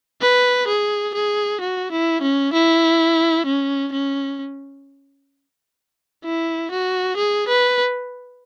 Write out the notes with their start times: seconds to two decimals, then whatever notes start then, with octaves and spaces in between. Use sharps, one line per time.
0.22 B4
0.68 G#4
1.14 G#4
1.61 F#4
1.92 E4
2.22 C#4
2.53 E4
3.47 C#4
3.93 C#4
6.25 E4
6.71 F#4
7.17 G#4
7.48 B4